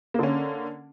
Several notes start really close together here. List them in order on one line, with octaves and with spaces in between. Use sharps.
A#3 D3 C#4